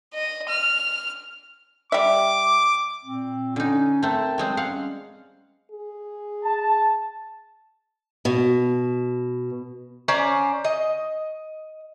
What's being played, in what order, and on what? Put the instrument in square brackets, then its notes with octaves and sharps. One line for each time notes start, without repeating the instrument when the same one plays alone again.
[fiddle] D#5
F6
[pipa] G3 E5 [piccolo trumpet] D6
[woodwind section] A#2 C4
[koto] D3 D#4 [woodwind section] C#4
[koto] A3 C4 [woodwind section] A#4 G5 A5
[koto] F#3 G#3 C4
[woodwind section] G3 C#4 [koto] F5 F#5
[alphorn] G#4
[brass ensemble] A5
[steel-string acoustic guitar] B2
[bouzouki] C#4 C5 D5 A#5
D#5